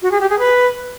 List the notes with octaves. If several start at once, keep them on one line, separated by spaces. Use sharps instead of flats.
F#4
G#4
G4
G#4
B4